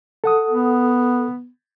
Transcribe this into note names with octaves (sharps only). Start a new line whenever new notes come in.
A4 F#5 D#6
B3